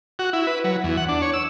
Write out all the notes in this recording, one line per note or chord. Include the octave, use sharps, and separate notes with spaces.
F#4
E4
B4
F#3
E2
F#5
D4
C#5
E6